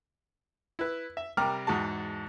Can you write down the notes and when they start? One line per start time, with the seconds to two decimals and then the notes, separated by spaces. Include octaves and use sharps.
0.79 E4 B4
1.17 E5
1.37 C3 G3 A#4 D6 F6
1.67 E2 G#2 F#4 A5